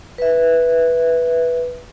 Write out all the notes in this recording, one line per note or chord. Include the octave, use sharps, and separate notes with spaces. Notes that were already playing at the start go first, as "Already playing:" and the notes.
B4 E5